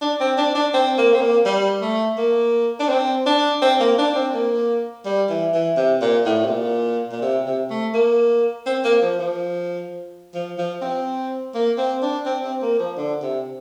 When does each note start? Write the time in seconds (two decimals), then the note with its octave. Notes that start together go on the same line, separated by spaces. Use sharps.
0.01 D4
0.20 C4
0.38 D4
0.55 D4
0.74 C4
0.98 A#3
1.14 C4
1.21 A#3
1.45 G3
1.82 A3
2.18 A#3
2.79 D4
2.89 C4
3.26 D4
3.62 C4
3.80 A#3
3.98 D4
4.15 C4
4.34 A#3
5.05 G3
5.30 E3
5.54 E3
5.77 C3
6.01 A#2
6.25 A2
6.44 C3
6.49 A#2
7.12 A#2
7.22 C3
7.46 C3
7.70 A3
7.94 A#3
8.66 C4
8.84 A#3
9.02 F3
9.19 F3
10.34 F3
10.58 F3
10.81 C4
11.54 A#3
11.77 C4
12.02 D4
12.26 C4
12.44 C4
12.62 A#3
12.79 F3
12.97 D3
13.22 C3